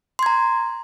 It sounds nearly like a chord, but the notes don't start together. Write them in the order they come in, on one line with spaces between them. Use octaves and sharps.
C6 G#6 A#5